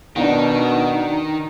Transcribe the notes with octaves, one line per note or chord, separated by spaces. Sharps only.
B2 D#3 D4 D#4 F#5